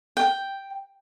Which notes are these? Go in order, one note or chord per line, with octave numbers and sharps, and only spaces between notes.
G5